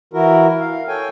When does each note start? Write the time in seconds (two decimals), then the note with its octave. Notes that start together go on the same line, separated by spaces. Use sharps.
0.14 E3 E4 F#4 A#4
0.60 F5
0.88 A4 C#5 G5 G#5